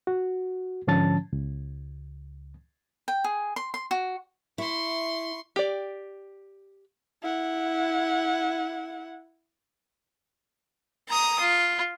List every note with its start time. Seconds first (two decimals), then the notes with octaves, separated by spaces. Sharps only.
0.07 F#4
0.87 G#2 D3 F3 C#4 A5 A6
1.33 C#2
3.08 G5
3.24 G#4
3.56 C6
3.74 C6
3.91 F#4
4.58 E4 C6 C#6
5.56 G4 D5
7.23 E4 F#5
11.08 A#5 D#6
11.40 F4